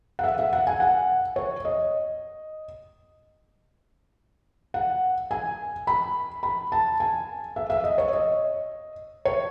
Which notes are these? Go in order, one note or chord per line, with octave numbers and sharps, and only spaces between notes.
F#5
E5
E5
F#5
G#5
F#5
C#5
D#5
F#5
G#5
B5
B5
A5
G#5
E5
E5
D#5
C#5
D#5
C#5